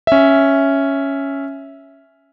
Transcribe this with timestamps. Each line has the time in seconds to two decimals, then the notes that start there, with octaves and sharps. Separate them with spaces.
0.07 C#4 E5